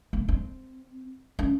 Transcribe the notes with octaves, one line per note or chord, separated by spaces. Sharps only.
A#3
C4
C#4